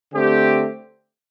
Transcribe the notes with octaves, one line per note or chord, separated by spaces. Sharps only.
D3 A3 C4 G4